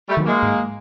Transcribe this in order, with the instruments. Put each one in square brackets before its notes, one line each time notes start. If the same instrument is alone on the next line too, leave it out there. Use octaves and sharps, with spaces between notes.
[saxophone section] G3 A3
[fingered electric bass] D#3 F#3
[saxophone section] G#3 A#3
[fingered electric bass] G#2